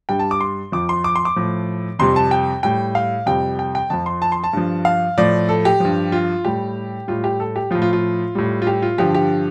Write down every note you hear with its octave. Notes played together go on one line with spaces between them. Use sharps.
G2 G3 G5
A5
D6
C6
F2 F3 D6
C6
D6
C6
D6
A2 F3
F2 C3 G3 C6
A5
G5
A2 G3 G5
F5
F2 C3 G3 G5
G5
G5
F2 F3 A5
C6
A5
C6
A5
G2 F3
F5
A2 F3 D5
A4
G4
G2 F3
F4
A2 G3 G4
A2 G3 F4
G4
A4
G4
A2 F3 F4
F4
F4
A2 G3
F4
G4
F4
G2 D3 F3 G4
G4